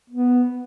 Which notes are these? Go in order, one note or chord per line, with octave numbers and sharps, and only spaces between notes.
B3